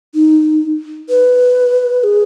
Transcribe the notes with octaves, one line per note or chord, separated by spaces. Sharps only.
D#4
B4
G#4